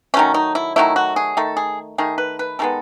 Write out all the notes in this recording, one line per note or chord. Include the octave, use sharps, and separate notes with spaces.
D#3 F#3 A3 C#4
D#4
E4
D#3 F#3 A3 E4
F#4
G#4
D#3 A3 A4
G#4
D#3 A3 G#4
B4
B4
D#3 G#3 B3 A4